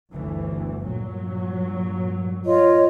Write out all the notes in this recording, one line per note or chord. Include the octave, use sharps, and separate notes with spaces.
G1 D2 E3
G2 A#2 F#3
F4 C#5 D#5